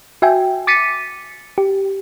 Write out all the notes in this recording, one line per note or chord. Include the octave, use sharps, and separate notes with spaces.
F#4 E5 G5 G#5
D6 A6 B6 C#7 D#7
G4